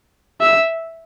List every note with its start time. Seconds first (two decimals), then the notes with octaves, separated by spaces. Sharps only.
0.41 E5